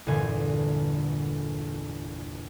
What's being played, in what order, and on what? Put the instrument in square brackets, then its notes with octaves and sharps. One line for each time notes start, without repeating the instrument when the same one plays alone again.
[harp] G1 E2 A#2 D3 G#5